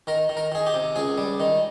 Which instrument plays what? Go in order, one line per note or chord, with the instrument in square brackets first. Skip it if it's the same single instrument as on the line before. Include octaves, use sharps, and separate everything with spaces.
[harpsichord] D#3 A#4
D#3
A#4
D#3 G#4
G4
C3
C#2 G#4
G3
D#3